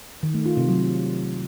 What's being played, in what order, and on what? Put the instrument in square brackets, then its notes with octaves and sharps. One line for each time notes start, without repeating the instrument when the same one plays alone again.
[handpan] D#3
A3
F4
C3
F#3